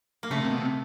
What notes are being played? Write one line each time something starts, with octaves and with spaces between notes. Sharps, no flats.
A#3
C#3 A3
C3
B2
C3